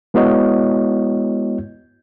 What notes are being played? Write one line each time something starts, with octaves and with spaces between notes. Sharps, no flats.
G#3 B3 E4 F#4 C#5 D#5